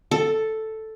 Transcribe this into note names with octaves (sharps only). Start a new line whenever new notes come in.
A4